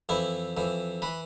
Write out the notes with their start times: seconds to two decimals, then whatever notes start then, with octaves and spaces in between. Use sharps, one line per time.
0.09 F2 E3 E4
0.57 F2 E3
1.02 E3 B4